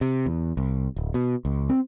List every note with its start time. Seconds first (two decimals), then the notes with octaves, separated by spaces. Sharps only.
0.01 C3
0.26 E2
0.57 C2
0.96 D1
1.14 B2
1.45 C#2
1.69 C4